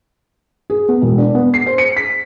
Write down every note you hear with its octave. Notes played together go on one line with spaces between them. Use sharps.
G#4
B3
E1
D4
B3
C7
C5
C#7
B6